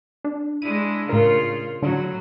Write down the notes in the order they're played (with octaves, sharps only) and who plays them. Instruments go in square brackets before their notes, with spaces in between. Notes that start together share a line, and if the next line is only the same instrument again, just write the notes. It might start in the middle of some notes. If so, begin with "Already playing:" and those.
[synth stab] D4
[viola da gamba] G#3 D4 E4 [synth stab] D#7
[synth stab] A2 A#4 [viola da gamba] C#3 F4
[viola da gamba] A2 F#3 [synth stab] D3